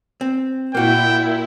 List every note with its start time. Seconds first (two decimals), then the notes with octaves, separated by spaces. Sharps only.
0.21 C4
0.75 A#2 A#3 E4 F#4 G5